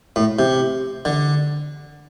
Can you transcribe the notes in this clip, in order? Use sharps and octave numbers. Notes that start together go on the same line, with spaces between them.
A2
C3
D3